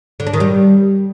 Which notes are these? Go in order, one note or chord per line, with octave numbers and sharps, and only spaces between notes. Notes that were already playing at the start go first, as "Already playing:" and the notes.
D3
D4
D#3
G3